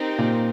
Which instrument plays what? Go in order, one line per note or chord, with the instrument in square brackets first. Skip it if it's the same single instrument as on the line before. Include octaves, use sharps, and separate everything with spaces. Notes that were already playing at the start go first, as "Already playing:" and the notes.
Already playing: [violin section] C4 D#4 G4 A#4
[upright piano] A#2